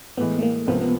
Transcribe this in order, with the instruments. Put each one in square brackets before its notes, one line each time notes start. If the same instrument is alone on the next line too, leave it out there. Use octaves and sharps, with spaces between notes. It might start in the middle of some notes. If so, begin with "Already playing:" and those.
[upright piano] A2 E3 G#3 [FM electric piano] B3
[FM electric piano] A3
A#3
[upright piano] C#2 C3 F3 A#3 [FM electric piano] B3
[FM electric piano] B3